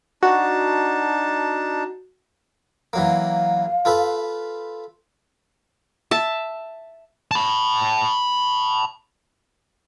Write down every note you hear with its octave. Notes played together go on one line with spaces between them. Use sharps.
D4 D#4 F#4 A5
E3 F#3 A#3 F5
F4 A4 B4
E5 A5
A5 B5